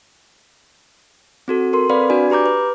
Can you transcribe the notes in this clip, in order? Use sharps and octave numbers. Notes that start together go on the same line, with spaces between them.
C4 F#4 A4
A4 A#4 C6
C4 B4 D5 F5 B5
D4 F#4 D5 G#5
G4 B4 A#5 D6 G6
B4